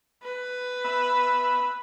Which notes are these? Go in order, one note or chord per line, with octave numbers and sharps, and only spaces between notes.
B4
B3 E5 B5